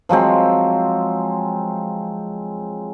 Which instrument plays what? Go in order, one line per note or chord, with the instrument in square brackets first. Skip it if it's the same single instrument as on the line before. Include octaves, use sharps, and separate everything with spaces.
[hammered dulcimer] F3 F#3 G#3 C4